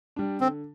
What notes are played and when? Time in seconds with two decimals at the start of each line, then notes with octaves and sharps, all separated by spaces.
0.16 G3 D4
0.40 D3 C4